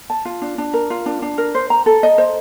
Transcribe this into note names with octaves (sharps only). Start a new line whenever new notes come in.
A5
F4
D4
D4
A#4
F4
D4
D4
A#4
C5
A#5
A4
D#5
C5